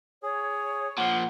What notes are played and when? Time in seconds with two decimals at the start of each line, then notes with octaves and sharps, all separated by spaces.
0.23 G#4 C#5
0.98 A#2 F3 F#5